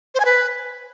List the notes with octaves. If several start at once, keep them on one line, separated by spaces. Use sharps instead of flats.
C5
G#5
B4